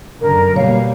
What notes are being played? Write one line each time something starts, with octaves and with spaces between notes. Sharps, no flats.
F#2 D3 A#4
B2 G3 A#3 C#5 F5